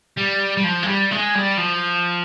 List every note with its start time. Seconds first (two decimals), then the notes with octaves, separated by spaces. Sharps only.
0.17 G3
0.57 G3
0.64 F3
0.83 G#3
0.87 G3
1.11 G#3
1.35 G3
1.57 F3